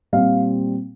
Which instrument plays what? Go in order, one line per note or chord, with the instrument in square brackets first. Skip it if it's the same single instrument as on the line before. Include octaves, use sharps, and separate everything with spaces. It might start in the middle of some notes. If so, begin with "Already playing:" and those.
[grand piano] A#2 G3 C4 F5